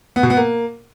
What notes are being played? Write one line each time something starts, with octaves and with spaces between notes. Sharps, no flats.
B3
B2
B3
A#3